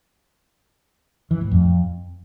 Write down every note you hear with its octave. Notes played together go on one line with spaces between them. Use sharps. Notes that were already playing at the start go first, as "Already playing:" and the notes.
E3
A2
F2